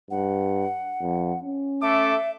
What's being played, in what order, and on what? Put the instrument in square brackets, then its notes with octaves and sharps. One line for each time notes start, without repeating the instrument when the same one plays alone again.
[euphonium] G2 [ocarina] F#5
[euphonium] F2
C#4
[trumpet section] A3 A4 D6 [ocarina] E5